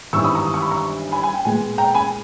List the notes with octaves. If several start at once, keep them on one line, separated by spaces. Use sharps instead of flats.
G#1 G2 E3 G3 B3 C#6 E6
B5 D#6
A#5 C#6
D#6
C#6
B5
A#5 C#6
G#5 B5
G#5 B5
G5
A#2 G#3 B3 G#5
G5 A#5
G#5 B5